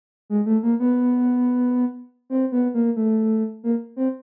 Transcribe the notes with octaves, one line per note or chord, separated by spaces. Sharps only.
G#3
A3
A#3
B3
C4
B3
A#3
A3
A#3
C4